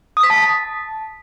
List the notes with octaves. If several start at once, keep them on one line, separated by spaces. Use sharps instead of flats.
D#6
B6
A5